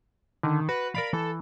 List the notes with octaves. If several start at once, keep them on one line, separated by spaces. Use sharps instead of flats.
D3 D#3
F#4 B4
A#4 D5 F5 B5
E3 A4